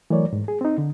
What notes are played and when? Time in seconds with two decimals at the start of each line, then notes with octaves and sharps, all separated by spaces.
0.10 E3 F#3 A3 A#4 C#5 D5
0.33 G#2
0.48 G#4
0.61 C4 D#4
0.78 D3